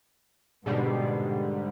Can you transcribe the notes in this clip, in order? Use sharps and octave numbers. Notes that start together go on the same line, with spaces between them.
G#2 B2 D3 G3